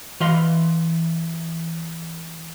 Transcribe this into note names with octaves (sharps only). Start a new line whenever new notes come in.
E3 D#5 F5 B5 C6